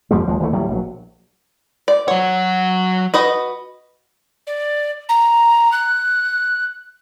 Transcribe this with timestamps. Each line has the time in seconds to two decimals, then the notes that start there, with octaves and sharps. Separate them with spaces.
0.11 F2 F3 G3 G#3
0.28 D#2 F3 G#3
0.40 D2 E3 A3
0.53 A2 F#3 G3
0.68 A#1 F#3
1.88 D5
2.08 F#3 C#5 F#5
3.14 F#4 B4 D#5
4.47 D5
5.09 A#5
5.72 F#6